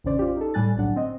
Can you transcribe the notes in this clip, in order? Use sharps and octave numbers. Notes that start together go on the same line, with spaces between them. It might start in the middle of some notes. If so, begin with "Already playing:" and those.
A1 F2 C#3 C#4 C5 D5
F4 G4
D#4 A4
A2 G3 G#5 F#6 A6
G1 C2 A2 F#3 D4 F#5
C4 D#5